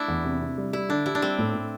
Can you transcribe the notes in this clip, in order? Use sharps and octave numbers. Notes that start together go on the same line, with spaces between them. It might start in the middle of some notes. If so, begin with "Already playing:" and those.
Already playing: A3 D4 E4
E2
C3
C3
G3
G3 E4
D3 D4
E4 G4
D4
G3 C4
A2
A2